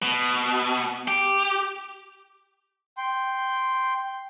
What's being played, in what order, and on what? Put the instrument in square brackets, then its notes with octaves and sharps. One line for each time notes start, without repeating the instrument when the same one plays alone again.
[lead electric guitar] B2
G4
[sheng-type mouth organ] G5 C6